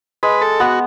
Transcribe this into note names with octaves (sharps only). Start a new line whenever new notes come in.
G#3 B4
A4
B3 F#4